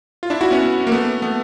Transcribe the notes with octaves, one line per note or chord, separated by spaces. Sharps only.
F4
D4 E4
E4 F#4
B3 C#4
A#3
A3 B3
A3 B3